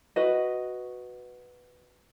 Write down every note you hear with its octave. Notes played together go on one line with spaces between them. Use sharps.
F#4 B4 D#5